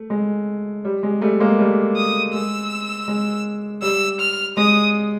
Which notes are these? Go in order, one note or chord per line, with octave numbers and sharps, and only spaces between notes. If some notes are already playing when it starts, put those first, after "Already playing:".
Already playing: A3
G#3
G3
G#3
G3 A3
G#3 A#3
G3 A3
D#6
G#3 E6
G#3
G3 E6
F6
G#3 D#6